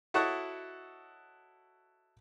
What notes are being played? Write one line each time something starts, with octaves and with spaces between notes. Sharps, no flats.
E4 F#4 A4 C#5 D#5 F#5